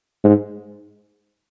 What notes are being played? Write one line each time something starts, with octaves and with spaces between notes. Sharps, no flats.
G#2